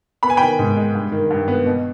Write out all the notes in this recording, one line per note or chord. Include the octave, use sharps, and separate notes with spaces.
B3 B5
G#5
D#3 G5 B5
G#2
G#3
G2
D#3
G2
B3
B2